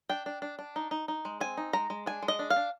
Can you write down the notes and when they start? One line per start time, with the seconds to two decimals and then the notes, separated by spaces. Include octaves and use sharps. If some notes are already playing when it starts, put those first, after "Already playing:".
0.10 D4 G5
0.26 D4
0.42 D4
0.59 D4
0.76 D#4
0.91 D#4
1.08 D#4
1.25 G#3
1.40 C4 G#5
1.57 D#4
1.73 G#3 A#5
1.90 G#3
2.06 D4 G#5
2.22 G#3
2.28 D#5
2.39 D4
2.50 F5
2.56 D4